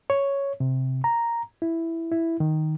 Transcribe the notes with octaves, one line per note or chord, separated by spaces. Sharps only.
C#5
C3
A#5
E4
E4
D#3